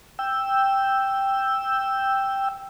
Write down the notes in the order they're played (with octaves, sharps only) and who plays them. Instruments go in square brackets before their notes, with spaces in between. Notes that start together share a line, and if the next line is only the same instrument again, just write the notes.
[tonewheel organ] G5 E6